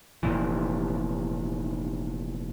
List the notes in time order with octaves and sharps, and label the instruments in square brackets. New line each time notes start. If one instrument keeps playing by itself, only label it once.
[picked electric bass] F1 C2 A#2 E3